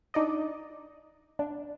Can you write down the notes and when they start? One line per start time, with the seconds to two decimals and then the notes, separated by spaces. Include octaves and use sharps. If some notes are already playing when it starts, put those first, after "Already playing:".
0.14 D4 D#4 D5 D#5
1.39 D4